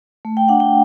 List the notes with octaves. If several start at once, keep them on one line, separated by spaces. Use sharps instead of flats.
A3
G5
D4 F#5
G5